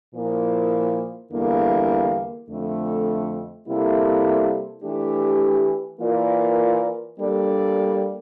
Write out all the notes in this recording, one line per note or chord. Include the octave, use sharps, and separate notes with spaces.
A#2 F3 A#3 E4
E2 D3 G3 A#3 E4
F2 D3 A3
C3 G3 A#3 E4 A4
E3 A3 D4 G4
E3 A#3 F4 A#4 D5
G3 A#3 D4 A4 D5